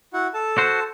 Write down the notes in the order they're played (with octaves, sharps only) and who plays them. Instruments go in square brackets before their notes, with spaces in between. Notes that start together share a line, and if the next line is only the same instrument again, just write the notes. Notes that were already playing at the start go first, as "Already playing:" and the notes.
[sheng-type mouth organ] E4 F#4 F#5
A4 A5
[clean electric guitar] F#4 C5